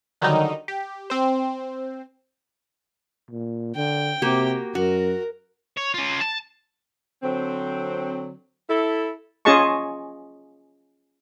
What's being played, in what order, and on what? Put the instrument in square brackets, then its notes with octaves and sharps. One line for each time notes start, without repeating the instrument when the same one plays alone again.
[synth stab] D3 D#3 F#3 G3 D#4
G4
C4 C5
[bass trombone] A#2
[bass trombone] D3 [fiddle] G5
[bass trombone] C3 [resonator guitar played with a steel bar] A#3 F#4 G4
[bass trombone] F#2 [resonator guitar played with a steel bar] F#4 [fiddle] A#4
[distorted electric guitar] C#5
C#4 F4
A5
[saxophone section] D3 F#3 C4
E4 A4
[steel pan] C#4 F4 G#4 D#5 A5 C#6